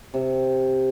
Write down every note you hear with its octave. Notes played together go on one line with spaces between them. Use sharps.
C3